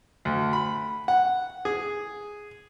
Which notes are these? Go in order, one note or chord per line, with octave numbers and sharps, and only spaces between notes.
D2
B5
F#5
G#4